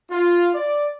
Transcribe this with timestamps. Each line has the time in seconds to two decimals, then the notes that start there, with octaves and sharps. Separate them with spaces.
0.11 F4
0.55 D5